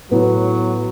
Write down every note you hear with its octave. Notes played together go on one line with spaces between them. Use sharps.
A2 F#3 B3